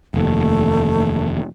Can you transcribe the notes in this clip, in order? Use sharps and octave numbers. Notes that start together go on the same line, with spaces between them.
F1 D#2 A3